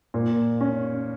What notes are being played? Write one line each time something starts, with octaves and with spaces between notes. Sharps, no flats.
A#2
C#4